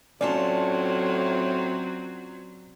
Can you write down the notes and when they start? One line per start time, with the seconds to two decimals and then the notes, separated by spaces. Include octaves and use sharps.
0.21 A2 F#3 C4 C#4 F4 D5 A5